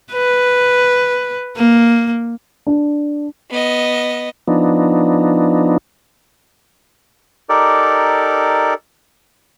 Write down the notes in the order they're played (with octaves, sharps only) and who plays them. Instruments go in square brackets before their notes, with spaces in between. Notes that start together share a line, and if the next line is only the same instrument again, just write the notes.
[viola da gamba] B4
A#3
[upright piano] D4
[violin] B3 D#5
[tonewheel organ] F3 B3 D4 D#4
[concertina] D#4 G4 A4 A#4 D5